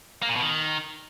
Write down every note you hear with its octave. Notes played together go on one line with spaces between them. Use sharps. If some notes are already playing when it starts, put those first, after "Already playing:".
A#3
A#2
B2
D#3